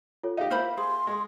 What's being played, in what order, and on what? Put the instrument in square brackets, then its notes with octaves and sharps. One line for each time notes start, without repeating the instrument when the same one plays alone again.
[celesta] F4 A4 C#5
[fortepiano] D#4 G4 [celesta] F5
[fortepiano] A#3 E4 [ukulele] F4 C5 B5
[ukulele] G#4 [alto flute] C6
[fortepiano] G#3